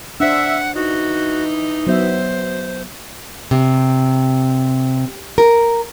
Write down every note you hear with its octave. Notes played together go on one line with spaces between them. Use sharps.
D4 C5 E5 F#5
E3 D#4 F#4
F#3 B3 C5 E5
C3
A#4